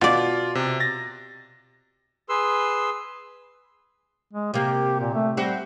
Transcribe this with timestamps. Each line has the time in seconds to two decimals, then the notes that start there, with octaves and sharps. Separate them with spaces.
0.01 B2 F4 D5
0.55 C3
0.80 A6 A#6
2.29 G#4 B4 C6 E6
4.33 G#3
4.54 C3 A#3 G4
5.00 A#2
5.14 A3
5.37 G3 C4 F#4 G4